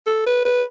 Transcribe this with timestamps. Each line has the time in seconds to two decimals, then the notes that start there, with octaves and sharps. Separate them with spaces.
0.07 A4
0.26 B4
0.45 B4